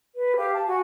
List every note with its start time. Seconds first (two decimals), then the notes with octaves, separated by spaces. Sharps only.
0.15 B4
0.36 G4 F5
0.54 A5
0.66 F#4 G#5